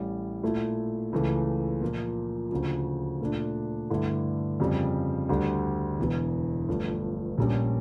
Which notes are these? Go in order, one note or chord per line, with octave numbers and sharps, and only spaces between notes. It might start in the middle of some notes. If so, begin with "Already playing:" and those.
Already playing: A1 A2 G3
A#2 A3 E4
C#2 C#3 E3 A3
A#2 F3 A#3
D2 C#3 F3
A#2 A3 D4
G2 D3 A3 E4
F2 C#3 G3
D2 D3 G3
E1 E2 E3
G1 G2 F3 A3
A#1 A#2 G3 C#4